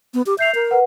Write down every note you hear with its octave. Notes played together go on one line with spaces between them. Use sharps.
B3
G4
E5 G6 C7 F7
A#4
B4 F#5